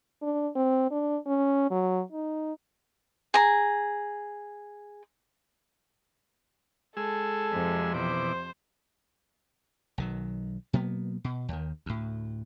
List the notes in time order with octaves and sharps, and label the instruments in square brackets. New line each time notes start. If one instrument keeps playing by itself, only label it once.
[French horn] D4
C4
D4
C#4
F#3
D#4
[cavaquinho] G#4 A#5
[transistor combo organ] G#3 G#4 E6 [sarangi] A4
[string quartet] F2 C3
[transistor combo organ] B2 E3 D6 [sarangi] C5
[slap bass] B1 D#3 F#3
B2 F#3 A#3 B3
B2
D#2 D#3
D2 A2